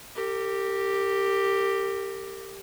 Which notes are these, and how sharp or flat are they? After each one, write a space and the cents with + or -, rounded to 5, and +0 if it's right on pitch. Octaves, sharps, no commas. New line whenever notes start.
G4 +0 A#4 -35